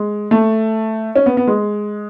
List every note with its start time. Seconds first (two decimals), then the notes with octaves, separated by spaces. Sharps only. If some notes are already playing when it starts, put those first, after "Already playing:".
Already playing: G#3
0.31 A3
1.16 C#4
1.26 B3
1.37 B3
1.47 G#3